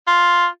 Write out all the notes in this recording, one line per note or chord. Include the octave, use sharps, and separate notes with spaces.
F4